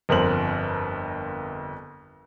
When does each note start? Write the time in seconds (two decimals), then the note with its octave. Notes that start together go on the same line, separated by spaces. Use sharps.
0.09 G1 F2 A#4 C5 F#7